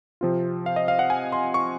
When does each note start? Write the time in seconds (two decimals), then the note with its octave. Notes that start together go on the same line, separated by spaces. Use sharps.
0.21 C3 F3 C4 F4
0.66 F5
0.76 D#5
0.88 F5
0.99 F#5
1.10 G#5
1.32 C6
1.54 C#6